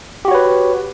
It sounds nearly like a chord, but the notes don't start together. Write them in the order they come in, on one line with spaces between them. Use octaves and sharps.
G4 F#4 C#5 B4